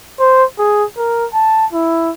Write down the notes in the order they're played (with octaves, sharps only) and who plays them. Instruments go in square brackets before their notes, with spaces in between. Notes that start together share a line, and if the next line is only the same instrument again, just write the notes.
[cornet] C5
G#4
A#4
A5
E4